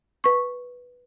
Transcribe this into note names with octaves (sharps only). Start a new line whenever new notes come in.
B4 C#6